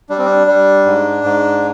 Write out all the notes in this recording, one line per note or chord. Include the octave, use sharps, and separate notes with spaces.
G3 D4
C4
D4
G3
G#2
G#2